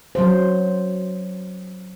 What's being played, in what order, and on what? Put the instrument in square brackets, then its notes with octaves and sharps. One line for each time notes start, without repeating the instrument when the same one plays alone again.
[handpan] F#3 C5